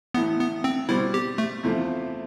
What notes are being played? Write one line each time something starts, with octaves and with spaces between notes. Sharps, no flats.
A1 A2 E3 B3
B3
C4
B2 G3 C4 E4
G4
A3
E2 C3 F3 A3